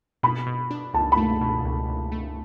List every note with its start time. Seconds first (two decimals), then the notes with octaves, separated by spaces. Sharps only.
0.23 B2 B5
0.47 B2
0.71 D4
0.94 C#2 A5
1.12 B5
1.17 A3
1.41 B2
1.64 C#2
1.89 C#2
2.12 A3